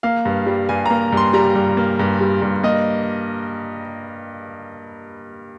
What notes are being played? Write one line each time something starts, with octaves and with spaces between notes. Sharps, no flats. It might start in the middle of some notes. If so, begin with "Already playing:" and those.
A#3 F5
G2
G3
G2 G#5
A#3 A#5
G2
C6
G3 A#5
G2
A#3
G2
G3
G2
A#3 D#5